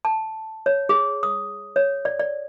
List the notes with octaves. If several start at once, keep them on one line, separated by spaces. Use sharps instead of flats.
A5
C#5
G#4
D#6
C#5
D5
D5